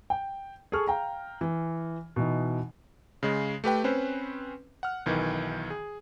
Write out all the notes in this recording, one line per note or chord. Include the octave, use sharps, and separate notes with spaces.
G5
G#4 A4 C#6 F6
F5 G5 A#5
E3
B2 E3 D#4
C#3 G#3
A3 G4 B4 G5
C4 C#4 B4 C5
F#5 F6
B1 D#3 E3
G#4